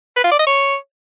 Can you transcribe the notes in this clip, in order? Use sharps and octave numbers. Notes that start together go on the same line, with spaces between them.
B4
F4
D5
D#5
C#5